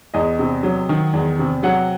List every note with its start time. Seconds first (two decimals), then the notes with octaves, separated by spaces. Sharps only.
0.14 E2 D#5
0.39 C3
0.63 F#3
0.89 D#3
1.13 E2
1.39 C3
1.63 F#3 F#5